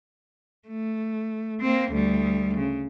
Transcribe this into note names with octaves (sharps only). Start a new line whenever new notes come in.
A3
A#3 C4
D2 G3
C#3